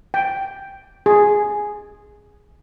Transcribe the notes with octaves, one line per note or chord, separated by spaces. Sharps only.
G5
G#4